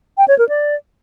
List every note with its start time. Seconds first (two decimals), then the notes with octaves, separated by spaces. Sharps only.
0.18 G5
0.28 C#5
0.39 A#4
0.49 D5